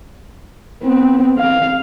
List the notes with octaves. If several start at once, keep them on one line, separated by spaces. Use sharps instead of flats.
B3 C4
F5